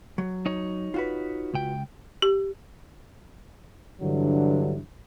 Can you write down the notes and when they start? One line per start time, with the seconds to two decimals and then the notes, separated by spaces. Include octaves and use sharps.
0.18 F#3
0.46 D#4 C#5
0.94 F4 F#4 B4
1.54 C#2 G5
2.22 G4
4.01 G2 D3 E3 F#3